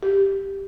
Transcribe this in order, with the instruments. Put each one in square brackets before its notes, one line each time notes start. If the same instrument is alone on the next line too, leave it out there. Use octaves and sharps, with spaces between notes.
[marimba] G4